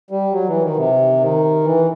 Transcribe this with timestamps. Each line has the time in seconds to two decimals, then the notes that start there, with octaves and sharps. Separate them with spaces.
0.11 G3
0.32 F#3
0.47 E3
0.62 D#3
0.77 C3
1.20 D#3
1.64 E3